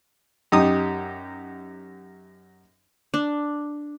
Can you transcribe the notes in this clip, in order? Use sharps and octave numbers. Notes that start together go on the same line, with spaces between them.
F#2 D#4 G4 D#6
D4